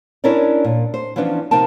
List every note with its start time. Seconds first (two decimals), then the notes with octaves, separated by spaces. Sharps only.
0.24 C#4 D4 E4 A#4 C#5 D5
0.65 A#2
0.94 C5
1.16 E3 F3 B3 C#4 D4
1.51 C3 F3 D#4 A#4 G5 A5